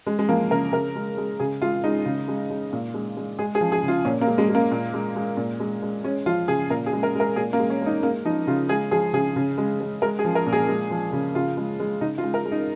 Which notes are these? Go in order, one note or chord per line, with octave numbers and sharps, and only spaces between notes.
G#3
G#3
F3 A#3
C#3 A#4
C#3 A#4
G#3
G#3
C#3 G#4
G#3 F4
G#3 D#4
C#3
G#3
G#3
A#2
G#3
G#3
G#3 G#4
G#4
F3
G#4
C#3
F4
A#2 C#4
A#3
G#3
G#3
G#3
A#3
A#2
G#3
G#3
A#2
G#3
G#3
G#3 C#4
F3 F4
C#3 G#4
A#2 A#4
G#4
G#3
A#4
G#3 A#4
A#2 G#4
A#3
G#3
C#4
G#3 D#4
G#3 A#3
F3 D#4
C#3 F4
G#3 G#4
F3 G#4
C#3 G#4
C#3
G#3
G#3
G#3 A#4
G#4
F3
A#4
A#2
G#4
G#3
F3
C#3
C#3 F4
G#3
G#3
C#3 D#4
F4
G#3
A#4
G#3
D#4